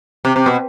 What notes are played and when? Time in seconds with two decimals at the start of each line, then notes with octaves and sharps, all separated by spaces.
0.25 C3
0.36 C3
0.46 B2